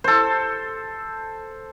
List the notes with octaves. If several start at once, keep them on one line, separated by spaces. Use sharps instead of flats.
A4 C5